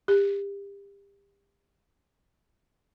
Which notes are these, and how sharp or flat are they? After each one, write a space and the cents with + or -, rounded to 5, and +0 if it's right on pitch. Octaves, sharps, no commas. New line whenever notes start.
G4 +30